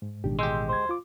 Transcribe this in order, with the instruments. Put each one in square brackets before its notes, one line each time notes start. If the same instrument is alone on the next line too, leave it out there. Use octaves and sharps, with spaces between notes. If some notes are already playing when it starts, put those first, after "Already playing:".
[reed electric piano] G#2
[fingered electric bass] A1 B2 D#3 [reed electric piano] G#3 D4 G4
[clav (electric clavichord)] G#3 G4 [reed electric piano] C6 E6 G6
[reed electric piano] D2 G#6 [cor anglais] C5
[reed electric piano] F4 D6